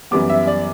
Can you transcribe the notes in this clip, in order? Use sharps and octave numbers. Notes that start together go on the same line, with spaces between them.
F#2 E3 G3 B3 D6
E5
D5